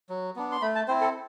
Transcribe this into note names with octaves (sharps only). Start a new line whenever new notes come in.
F#3
B3 D4
C6
A3 B5
A5
C4 E4 C5
A4